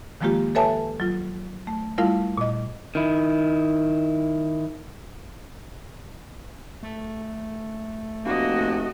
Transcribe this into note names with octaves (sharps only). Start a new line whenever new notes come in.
D#3 F3 G#3 A#3 F4 G4
A4 B4 C#5 E5 G#5 A5
F#3 F4
A3
G3 A3 E4 F4 A#4 F5
A#2 D#5
D#3 E4
A3
F1 A#3 F#4 D#5